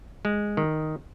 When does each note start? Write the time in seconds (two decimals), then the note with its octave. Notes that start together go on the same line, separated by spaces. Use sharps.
0.25 G#3
0.57 D#3